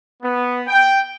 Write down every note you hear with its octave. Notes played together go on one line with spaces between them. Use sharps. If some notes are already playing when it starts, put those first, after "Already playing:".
B3
G5